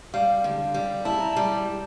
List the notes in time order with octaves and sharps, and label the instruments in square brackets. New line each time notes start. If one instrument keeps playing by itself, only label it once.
[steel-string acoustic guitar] G3 [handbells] F5
[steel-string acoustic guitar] D3
G3
[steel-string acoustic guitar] E4 [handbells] A5
[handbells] A#5
[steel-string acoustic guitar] G3 [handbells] A5